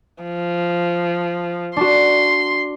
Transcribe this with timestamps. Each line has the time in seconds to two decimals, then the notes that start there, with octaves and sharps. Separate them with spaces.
0.23 F3
1.77 D4 F#4 C6